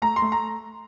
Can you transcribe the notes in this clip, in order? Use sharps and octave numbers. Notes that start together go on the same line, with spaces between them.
A3 A#5
C6
A3
A#5